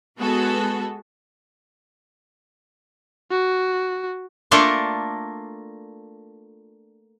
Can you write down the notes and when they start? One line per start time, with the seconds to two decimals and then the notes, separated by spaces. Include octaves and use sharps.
0.18 G#3 B3 F#4 G#4 A4
3.31 F#4
4.51 A3 A#3 D4 F4 A4 A#4